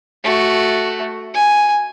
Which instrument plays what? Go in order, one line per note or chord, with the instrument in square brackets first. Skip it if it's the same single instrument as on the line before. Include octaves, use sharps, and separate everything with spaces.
[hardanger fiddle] A3 F#4
G#5